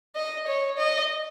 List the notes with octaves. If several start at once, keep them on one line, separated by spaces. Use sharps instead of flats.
D#5
C#5
D#5